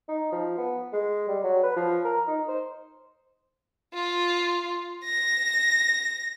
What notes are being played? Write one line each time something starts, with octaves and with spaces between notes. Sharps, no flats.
D#4
F3
B3
G#3
G3
F#3
B4
F3
A#4
D#4
C5
F4
A#6